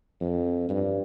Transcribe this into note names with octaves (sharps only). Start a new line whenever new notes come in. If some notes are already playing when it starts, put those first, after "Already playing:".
F2
G2